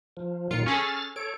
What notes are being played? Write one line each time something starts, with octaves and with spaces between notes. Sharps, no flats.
F3
A#2 D#3 F#3 F4 C#7
C#4 G#4 A4 F6 A6
A4 C#5 D7